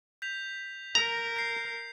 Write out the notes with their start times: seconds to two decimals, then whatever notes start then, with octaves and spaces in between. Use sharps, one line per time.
0.22 G6 B6 F7
0.95 A#4 A#5
1.36 G6 C7